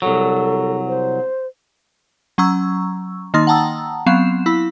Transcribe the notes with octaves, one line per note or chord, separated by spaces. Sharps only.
C2 F#3 A4
C5
F#3 C#4 A#5 C#6 E6
D#3 A#3 D#4 C6 A6
F#5 G5 A5 A#5 D#6 E6
F#3 B3 C4 F5 C7 E7
E4 B5